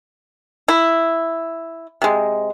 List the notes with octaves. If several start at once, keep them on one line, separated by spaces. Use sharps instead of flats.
E4
C3 G#3